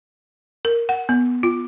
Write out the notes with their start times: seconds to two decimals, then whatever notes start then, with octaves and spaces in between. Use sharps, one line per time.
0.65 A#4
0.89 F#5
1.09 B3
1.43 F4